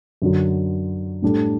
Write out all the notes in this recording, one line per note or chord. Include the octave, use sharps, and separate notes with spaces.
F#2 D3 F#3
A2 G3 D4 A4